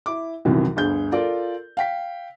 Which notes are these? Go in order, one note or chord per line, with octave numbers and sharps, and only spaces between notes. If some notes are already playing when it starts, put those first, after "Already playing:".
E4 D6
C2 F#2 C3 D#3 E3 F#3
G1 D2 G#4 G6
F4 A4 A#4 D5
F5 G5 B6